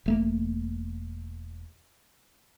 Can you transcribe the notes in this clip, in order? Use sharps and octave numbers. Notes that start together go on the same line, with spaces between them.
E1 A3 A#3